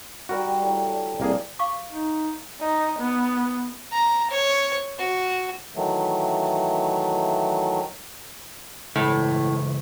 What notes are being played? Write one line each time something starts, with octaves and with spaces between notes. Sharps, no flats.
D#3 G3 F#4 A#4
A2
D4
C2 A#2 A#3 G#4
F5 C#6 D6
D#4
D#4
B3
A#5
C#5
F#4
D#3 E3 F#3 A3
C#2 A2 E3